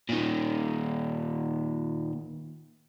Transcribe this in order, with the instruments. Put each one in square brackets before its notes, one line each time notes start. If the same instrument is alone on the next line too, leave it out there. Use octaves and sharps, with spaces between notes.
[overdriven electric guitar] A#2 D#3